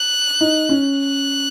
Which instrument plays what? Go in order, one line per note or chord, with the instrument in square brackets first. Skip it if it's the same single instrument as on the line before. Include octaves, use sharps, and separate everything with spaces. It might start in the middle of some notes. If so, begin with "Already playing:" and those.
Already playing: [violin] F#6
[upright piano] D#4
C#4
[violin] F#6